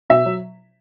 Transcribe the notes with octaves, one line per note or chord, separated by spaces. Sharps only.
B2 E5
F#3